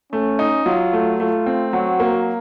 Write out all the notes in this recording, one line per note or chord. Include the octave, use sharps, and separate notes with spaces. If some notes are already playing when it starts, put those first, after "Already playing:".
A3 C#4
D#4
F#3 F4
A3
A3 F4
C4
F#3 F#4
A#3